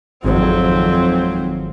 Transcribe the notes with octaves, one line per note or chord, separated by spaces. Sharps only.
G#1 F2 G#2 F#3 C4